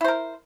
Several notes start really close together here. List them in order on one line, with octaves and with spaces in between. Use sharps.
E4 C5 A#4